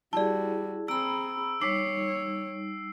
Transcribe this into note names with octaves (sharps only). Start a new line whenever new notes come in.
G3 E4 F#4 G#4 D5 A5
C4 G#4 A#5 B5 E6 D7
G3 D#4 C#5 D6 C7